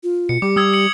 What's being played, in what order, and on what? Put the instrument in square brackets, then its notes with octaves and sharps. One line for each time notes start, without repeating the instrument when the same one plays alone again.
[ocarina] F4
[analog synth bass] B2 [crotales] C#7
[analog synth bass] G3 [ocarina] G4 [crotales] D6
[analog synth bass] G3 [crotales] D#6 E6 G#6
[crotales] C#7 F#7